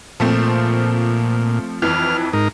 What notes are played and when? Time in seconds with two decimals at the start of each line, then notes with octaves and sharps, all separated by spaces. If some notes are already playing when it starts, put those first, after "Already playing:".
0.20 A#2 F3 A3 C4
1.82 F2 E3 F6
2.33 G#2 D#4 A#4